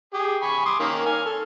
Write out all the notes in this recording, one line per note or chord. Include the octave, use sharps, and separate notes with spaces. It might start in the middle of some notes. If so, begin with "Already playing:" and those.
G4 G#4
G#5 B5 C#6
C6 D6 D#6
D#3 A#3 C#4
G#5 F6
A4